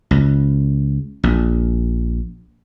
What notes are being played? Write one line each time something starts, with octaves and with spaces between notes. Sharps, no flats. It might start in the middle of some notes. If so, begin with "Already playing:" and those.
C#2
A#1